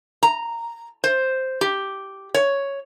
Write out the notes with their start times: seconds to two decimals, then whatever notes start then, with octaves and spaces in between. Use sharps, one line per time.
0.23 A#5
1.04 C5
1.61 G4
2.34 C#5